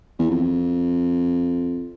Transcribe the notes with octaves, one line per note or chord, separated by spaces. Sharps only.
E2
F2